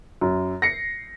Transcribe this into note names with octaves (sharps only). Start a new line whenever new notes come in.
F#2
A#6 C7 C#7